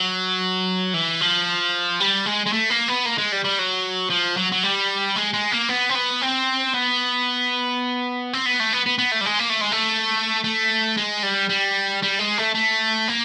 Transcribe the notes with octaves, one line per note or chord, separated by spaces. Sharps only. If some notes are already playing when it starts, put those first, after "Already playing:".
Already playing: F#3
E3
F3
G3
G#3
G#3
A3
A#3
B3
A#3
G#3
G3
G3
F#3
F3
F#3
F#3
G3
G#3
G#3
A#3
B3
C4
B3
C4
B3
C4
B3
A3
B3
B3
B3
A3
G3
G#3
A#3
A3
G#3
A3
A3
G#3
G3
G3
G3
G#3
A3
A3
A#3